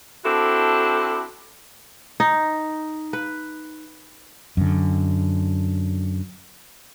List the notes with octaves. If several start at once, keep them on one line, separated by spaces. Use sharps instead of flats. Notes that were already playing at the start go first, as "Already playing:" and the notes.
C4 D4 E4 F#4 A4
D#4
B4
F#2 D3